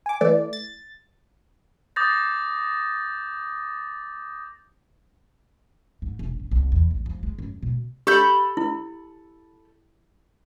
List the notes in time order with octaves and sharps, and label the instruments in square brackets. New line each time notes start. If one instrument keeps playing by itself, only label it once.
[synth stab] G#5 D6
E3 A3 D5
A6
[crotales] D6 D#6 G6 A6 A#6
[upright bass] G#2
E1
G1
C2
E2
A1
F2
G#3
F#2
B2
[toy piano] G4 [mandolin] A4 B5 G6
[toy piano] E4